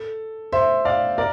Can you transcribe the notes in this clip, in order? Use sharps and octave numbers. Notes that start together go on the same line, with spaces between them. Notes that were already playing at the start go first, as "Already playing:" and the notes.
Already playing: A4
C5 E5
D5 F5
A#4 D5